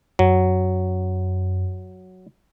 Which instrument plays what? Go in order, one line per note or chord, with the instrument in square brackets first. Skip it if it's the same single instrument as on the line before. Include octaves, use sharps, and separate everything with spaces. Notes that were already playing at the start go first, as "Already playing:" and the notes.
[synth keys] F#2 [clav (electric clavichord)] F#3